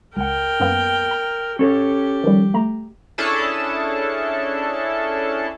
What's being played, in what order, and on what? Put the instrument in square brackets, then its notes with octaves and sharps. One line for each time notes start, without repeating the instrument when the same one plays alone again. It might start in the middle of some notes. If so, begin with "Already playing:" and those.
[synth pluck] C#2 F#5 [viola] A#4 G5
[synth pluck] F#2 A#3 B3
A#5
[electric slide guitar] C#4 A4 C#5 [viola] G4
[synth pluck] D#3 F3 G3
A3 A#5
[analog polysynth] C#4 D4 E4 G#4 A4 A5